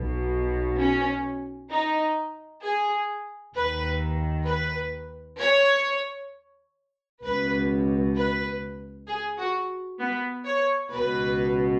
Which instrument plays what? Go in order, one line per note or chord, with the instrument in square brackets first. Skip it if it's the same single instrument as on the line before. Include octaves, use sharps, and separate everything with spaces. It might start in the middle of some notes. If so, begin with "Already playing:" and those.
Already playing: [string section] B1 B2
C#4
D#4
G#4
D#2 D#3 B4
B4
C#5
C#2 B2 B4
B4
G#4
F#4
B3
C#5
C#2 B2 B4